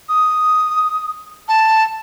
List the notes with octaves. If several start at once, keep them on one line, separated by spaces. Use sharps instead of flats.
D#6
A5